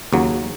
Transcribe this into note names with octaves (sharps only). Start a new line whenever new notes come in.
D#2 C#3 F#3